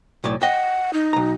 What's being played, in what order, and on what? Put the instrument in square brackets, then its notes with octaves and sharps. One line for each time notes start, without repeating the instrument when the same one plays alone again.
[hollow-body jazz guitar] B1 A2 D5
[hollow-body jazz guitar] D#5 G5 [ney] F#5
[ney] D#4
[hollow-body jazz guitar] B1 A#5